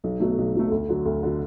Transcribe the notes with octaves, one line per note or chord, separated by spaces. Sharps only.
B1
B2 F#3 A3
B1
B2 F#3 A3
D2
D3 F#3
D2
D3 F#3